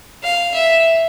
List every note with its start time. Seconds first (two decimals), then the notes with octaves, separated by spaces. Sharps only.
0.23 F5
0.54 E5